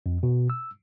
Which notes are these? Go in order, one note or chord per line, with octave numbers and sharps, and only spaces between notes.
F2
B2
E6